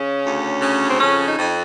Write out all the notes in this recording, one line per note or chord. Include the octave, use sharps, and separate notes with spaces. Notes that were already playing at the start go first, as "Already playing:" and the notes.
Already playing: C#3 C#4
D2
C#3
C4
F2 C#4
D#4
F2